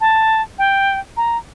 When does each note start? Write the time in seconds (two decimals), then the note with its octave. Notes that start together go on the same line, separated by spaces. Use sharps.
0.01 A5
0.59 G5
1.17 A#5